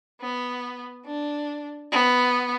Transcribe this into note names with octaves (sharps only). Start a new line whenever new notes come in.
B3
D4
B3